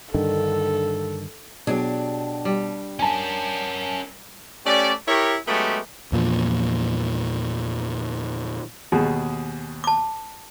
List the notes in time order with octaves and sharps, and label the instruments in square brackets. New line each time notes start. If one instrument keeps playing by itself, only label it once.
[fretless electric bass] G2 D3 D#3 [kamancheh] A4
[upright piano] B2 [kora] F#3 G#4 [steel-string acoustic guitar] D4 G4
[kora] G3
[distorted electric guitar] C#4 A#4 [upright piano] G#5 A5
[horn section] A3 C#4 G4 D5
E4 G4 A#4 C#5
F#3 G#3 A3 B3 C#4 G4
[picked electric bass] E2 A#2 F3
[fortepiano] D#2 B2 G#4
[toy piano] A5 D6